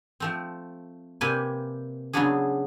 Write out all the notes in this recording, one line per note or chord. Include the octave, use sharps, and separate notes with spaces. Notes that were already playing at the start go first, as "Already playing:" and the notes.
F3 A3 C4
C3 A#3 G4 B4 D5 G#5
C#3 F#3 B3 D4 F#4 G#4